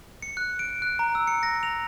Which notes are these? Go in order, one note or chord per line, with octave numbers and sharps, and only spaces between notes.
C#7
F#6
D7
F#6
A#5
E6
C#7
A#6
F7